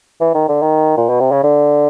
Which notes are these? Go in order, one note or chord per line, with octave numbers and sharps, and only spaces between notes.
E3
D#3
D3
D#3
A#2
B2
C3
C#3
D3